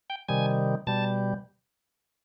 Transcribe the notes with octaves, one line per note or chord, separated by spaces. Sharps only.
G5
C3 D#3 G3 G#5
B2 G3 A5